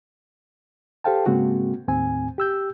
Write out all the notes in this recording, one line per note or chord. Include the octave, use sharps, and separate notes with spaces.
G4 A4 C5 F5 G5 A5
G#2 C#3 G#3 A#3 C4 F#4
D#2 A2 C4 G#5
G4 E6 G6